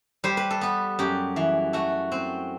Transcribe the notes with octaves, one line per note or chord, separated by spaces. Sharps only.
G3 C5
B4
A4
B3 B4
F#2 G4
E3
A3 F#4
C4